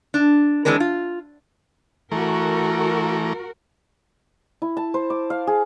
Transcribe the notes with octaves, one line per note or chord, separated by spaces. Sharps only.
D4
E3 G#3 C4 D4 A#4
F4
E3 A3 F#4 A#4 A#5
E4
A5
C5
D6
F5
G#4